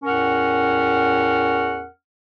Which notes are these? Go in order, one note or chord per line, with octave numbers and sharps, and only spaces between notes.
E2 A2 C#4 A#4 F#5 F6